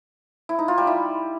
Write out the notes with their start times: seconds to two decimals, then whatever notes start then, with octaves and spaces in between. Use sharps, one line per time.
0.49 E4
0.59 D#4
0.68 F4
0.78 G3
0.87 E4